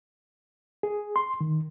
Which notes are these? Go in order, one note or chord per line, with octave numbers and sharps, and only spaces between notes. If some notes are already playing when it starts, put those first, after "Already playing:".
G#4
C6
D#3